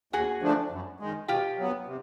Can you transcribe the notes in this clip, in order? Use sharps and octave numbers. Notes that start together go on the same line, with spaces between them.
D#2 F#4 G#4
D3 F3 A3 D4
F#2
D#3 G#3
B2 F4 G4
F#3 B3
C3